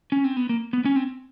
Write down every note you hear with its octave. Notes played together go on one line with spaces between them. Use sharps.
C#4
C4
B3
A#3
B3
C#4
C4